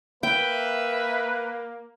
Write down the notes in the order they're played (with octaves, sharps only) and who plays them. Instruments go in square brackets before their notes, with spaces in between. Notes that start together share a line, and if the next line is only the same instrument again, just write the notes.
[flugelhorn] A#3 [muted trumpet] B4 [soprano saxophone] E5 [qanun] G5